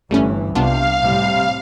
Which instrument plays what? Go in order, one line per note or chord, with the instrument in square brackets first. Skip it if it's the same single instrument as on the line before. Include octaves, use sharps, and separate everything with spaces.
[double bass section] G1 G2 E3 [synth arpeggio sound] G3 A3 C#4
[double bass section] C2 C3 [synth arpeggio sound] B3 D4 F4 [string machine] F5
[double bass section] A2 C3 G3